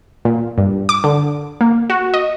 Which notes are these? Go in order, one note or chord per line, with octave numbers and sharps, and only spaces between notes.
A#2
G2
D6
D3
A#3
F#4
D#5